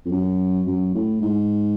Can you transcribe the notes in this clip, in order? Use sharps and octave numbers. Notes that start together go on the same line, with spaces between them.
F2
F#2
F#2
A2
G#2